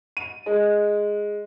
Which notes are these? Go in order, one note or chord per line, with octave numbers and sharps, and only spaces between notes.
D#7
G#3